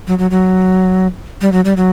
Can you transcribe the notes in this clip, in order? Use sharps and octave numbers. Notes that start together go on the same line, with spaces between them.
F#3
F#3
F#3
G3
F#3
G3
F#3